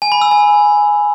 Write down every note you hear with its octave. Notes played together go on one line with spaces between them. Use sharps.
G#5
B5
E6
G#5